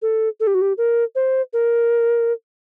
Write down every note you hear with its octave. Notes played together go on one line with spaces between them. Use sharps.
A4
A4
G4
F#4
G4
A#4
C5
A#4